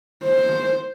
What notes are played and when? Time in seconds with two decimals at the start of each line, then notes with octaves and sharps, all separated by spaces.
0.25 C5